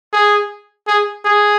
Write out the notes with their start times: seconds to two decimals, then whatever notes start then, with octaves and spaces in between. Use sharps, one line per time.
0.13 G#4
0.87 G#4
1.25 G#4